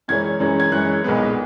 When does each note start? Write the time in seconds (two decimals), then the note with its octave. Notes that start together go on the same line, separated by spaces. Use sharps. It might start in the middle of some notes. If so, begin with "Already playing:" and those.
0.08 F#2 E3 G#3 C#4 G#6
0.40 F#2 E3 G#3 C#4
0.60 G#6
0.72 F#2 E3 G#3 C#4 F#6
1.04 B1 A#2 G#3 B3